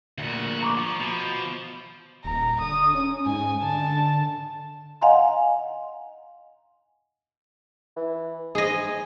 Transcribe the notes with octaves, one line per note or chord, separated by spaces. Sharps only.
D2 A#2 F#4
A#5 C#6 D6
F3
B2 F3
D#1 A#5
D3 D#6
C#4
G#2 G#5
D3 A5
D#5 F5 F#5 G#5 A#5 C6
E3
G#3 G#4 D#5